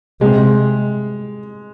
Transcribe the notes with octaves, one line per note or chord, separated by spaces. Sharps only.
C3 G#3